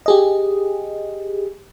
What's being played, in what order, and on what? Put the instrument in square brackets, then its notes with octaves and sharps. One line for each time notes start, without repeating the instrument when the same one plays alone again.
[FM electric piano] G4 G#4 D#5